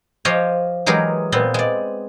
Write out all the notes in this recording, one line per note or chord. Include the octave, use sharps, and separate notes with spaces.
F3 F4 G4 C#5 D#5
E3 F#3 G#3 G4 G#4 A#4
A#2 B3 C4
G#3 D5